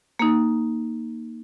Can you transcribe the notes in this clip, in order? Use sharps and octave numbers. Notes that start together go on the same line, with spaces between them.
A#3 D#4